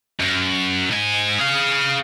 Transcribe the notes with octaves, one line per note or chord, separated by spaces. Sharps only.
F#2
G#2 G#5
G#4 F5